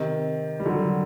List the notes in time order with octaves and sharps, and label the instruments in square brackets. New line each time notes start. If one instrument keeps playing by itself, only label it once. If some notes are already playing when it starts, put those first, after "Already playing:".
Already playing: [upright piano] C3 D#3
G3
D3 F#3